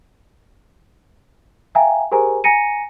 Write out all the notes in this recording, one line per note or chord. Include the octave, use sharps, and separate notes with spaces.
E5 F5 G5 G#5 A#5
G4 G#4 A#4 C5 G#5 A#5
G#5 A#5 A#6 C#7 D#7